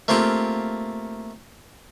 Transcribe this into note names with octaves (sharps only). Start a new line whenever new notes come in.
A3 A#3 C4 F4 G4